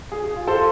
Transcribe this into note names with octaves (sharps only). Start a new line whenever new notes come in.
G#4
G#4
F4
A4 C5